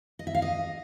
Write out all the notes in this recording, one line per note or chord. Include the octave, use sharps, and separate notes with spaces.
D#5
E5
F5
D#5